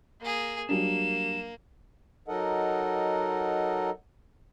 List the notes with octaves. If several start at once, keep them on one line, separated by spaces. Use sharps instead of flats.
A#3 G#4
F#3 G3 A#3 D4 E7
F#3 D#4 A4 A#4 D#5 F#5